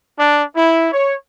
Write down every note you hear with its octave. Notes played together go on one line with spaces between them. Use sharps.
D4
E4
C#5